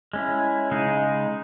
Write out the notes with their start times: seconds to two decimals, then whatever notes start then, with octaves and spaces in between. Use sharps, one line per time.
0.13 G#3 C#4 E4
0.71 C#3 G#3 D#4 G#4